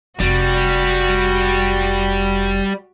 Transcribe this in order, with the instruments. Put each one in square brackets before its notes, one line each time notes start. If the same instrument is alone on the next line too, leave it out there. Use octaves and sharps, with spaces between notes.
[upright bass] F1 [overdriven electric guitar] G3 [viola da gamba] F#4